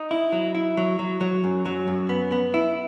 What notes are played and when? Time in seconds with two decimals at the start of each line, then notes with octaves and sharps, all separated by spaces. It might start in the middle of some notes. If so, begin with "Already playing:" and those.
Already playing: D#4
0.11 E4
0.32 F#3
0.55 E4
0.77 F#3
0.99 F#3
1.21 F#3
1.44 F#2
1.66 F#3
1.88 F#2
2.09 B3
2.32 B3
2.54 E4